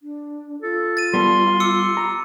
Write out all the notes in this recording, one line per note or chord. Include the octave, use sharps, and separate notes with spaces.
D4
F4 A4
A6 D#7
G3 B3 A4 C6
D6 E6 C#7
A#5